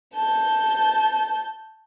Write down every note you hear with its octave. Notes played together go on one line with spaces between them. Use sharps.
A5 G6